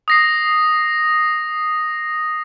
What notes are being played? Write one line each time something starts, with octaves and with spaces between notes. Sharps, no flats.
D#6 A#6 C7